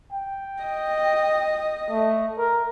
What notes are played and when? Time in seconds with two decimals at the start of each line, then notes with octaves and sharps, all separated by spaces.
0.12 G5
0.64 D#5
1.90 A3
2.38 A#4